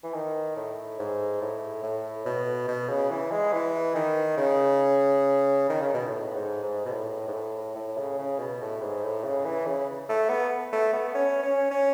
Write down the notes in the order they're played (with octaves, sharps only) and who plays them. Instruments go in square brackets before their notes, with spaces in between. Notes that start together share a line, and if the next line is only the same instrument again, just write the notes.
[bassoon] E3
D#3
A2
G#2
A2
A2
B2
B2
C#3
E3
G#3
E3
D#3
C#3
D#3
C#3
B2
A2
G#2
G#2
B2
A2
G#2
A2
A2
C#3
C#3
B2
A2
G#2
A2
C#3
E3
C#3
A3
B3
A3
B3
C#4
C#4
C#4